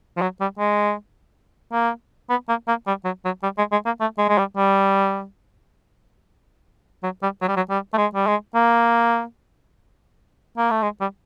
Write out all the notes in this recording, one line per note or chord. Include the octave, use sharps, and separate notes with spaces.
F3
F#3
G3
G#3
A#3
B3
A#3
A#3
G3
F#3
F#3
G3
G#3
G#3
A#3
A3
G#3
G#3
G3
G3
F#3
G3
F#3
G3
F#3
G3
A3
G#3
G3
G#3
A#3
A#3
A3
G#3
G3